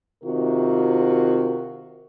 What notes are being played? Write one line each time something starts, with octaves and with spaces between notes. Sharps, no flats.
C3 D#3 F4 F#4 A#4